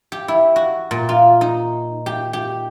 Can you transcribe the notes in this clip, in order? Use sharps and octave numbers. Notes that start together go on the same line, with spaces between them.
G4
E4
F#4
A#2
F4
D#4
G4
G4